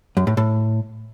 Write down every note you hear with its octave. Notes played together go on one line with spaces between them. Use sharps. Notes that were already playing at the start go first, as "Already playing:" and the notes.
F#2
A2
A2